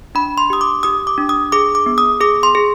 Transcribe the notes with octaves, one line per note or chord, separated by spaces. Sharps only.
D4 B5
C6
G4 D#6
D6
G4 D#6
D6
D4
D#6
G#4 D6
D6
B3
D#6
G#4 D6
C6
G#4